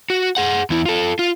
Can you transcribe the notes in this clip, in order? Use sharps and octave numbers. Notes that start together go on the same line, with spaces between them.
F#4
G#4 F#5
E2 E4
F4 A4
F4